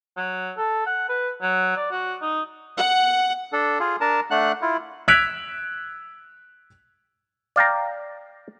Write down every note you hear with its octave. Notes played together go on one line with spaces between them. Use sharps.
F#3
A4
F#5
B4
F#3
D5
F#4
D#4
F#5
D4 A4
F4 G#4
D4 A#4 A5
A3 D4 F#5 F#6
E4 F4
E6 F#6 G#6 B6 D7 F7
D5 F5 G5 A#5